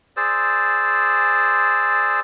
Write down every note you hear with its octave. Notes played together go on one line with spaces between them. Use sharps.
G#4 C5 D5 E6